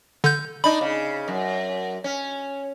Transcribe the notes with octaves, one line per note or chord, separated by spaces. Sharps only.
D3 G6
D4 D#4 B5
C#3
F#2
C#4